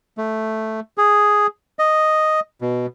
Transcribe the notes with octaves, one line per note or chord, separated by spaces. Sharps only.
A3
G#4
D#5
B2